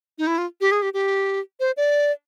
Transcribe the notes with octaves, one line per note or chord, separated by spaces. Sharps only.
D#4
E4
F4
G4
G#4
G4
G4
C5
D5